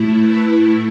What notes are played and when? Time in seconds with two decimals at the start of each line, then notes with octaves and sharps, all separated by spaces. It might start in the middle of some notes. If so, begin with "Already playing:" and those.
Already playing: A2 A3 E4
0.20 B4